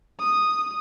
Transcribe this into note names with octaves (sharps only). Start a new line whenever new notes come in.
D#6